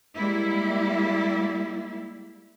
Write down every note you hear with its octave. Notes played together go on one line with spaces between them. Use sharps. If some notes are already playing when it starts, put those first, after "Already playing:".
G3 G#3 A#3 E4